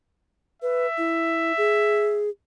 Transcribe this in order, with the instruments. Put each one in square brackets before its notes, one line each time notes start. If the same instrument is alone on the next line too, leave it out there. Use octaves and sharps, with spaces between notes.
[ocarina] B4 [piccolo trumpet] E5
[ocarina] E4
G#4